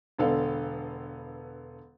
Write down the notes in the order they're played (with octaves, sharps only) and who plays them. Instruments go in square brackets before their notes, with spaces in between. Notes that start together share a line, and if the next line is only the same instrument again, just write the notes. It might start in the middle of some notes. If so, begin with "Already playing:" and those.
[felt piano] E1 D3 B3 A4 F5